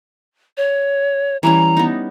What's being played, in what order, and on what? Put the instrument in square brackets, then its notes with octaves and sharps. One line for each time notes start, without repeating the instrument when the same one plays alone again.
[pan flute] C#5
[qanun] E3 G3 C#4 [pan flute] A#5
[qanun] B3 D#4